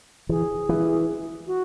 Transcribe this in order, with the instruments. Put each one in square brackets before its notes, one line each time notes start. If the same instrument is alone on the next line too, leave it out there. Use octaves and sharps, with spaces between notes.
[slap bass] E3 [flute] G#4
[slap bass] E3
[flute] F#4